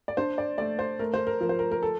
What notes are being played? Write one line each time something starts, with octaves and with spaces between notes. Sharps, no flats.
D5
D4 C5
D5
A3 D5
C5
A3 A#4
C5
A#4
F3 A#4
C5
A#4
A#4
A4